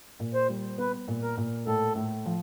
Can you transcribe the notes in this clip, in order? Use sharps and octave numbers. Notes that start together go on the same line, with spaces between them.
A#2
C5
G3
B3 B4
A#2
A#4
A#2
A2 A4
A2
F3